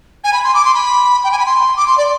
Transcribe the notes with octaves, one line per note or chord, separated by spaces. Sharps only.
G#5
B5
C6
D6
C6
B5
G5
G#5
B5
C6
D6
C6
D5